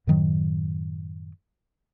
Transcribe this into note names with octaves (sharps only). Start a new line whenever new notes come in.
F#2 A2 D#3 F#3